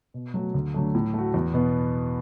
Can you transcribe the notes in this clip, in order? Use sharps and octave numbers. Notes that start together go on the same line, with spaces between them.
B2
F#3 A3 F#4
D2
D3 F#3 A3
A2
A3 F#4
E2
B2 B3